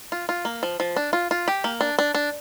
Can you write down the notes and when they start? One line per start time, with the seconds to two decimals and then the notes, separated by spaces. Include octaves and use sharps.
0.12 F4
0.29 F4
0.45 A#3
0.63 F3
0.80 F3
0.96 D4
1.13 F4
1.31 F4
1.48 G4
1.64 A#3
1.81 D4
1.99 D4
2.15 D4